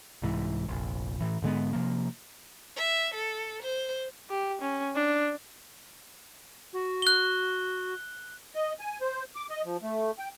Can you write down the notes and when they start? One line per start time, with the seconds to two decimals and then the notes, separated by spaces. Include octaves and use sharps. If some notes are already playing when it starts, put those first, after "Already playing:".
0.22 C2 G#2 E3
0.69 F1 A#1
1.21 A2 E3
1.42 G#2 D3 G#3 B3
1.73 C3 F3 A#3
2.76 E5
3.14 A4
3.63 C5
4.30 G4
4.61 C#4
4.96 D4
6.73 F#4
7.02 F#6 G7
8.55 D#5
8.80 G#5
9.01 C5
9.36 D6
9.50 D#5
9.65 F3
9.82 A3
10.19 G5